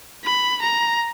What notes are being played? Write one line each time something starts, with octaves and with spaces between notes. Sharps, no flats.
B5
A#5